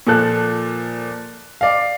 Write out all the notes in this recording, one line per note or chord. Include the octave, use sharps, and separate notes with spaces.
A#2 F3 A4 F#6
D5 F5